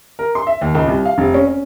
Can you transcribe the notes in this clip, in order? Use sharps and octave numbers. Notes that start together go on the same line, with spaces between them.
A#4
C6
E5
D#2
C#2
C2
F5
F1
C#4
C#4